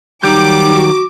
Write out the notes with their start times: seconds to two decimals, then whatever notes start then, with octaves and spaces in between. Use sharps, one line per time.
0.23 D#3 F#3 G3 D#4 D6 G6
0.74 F#4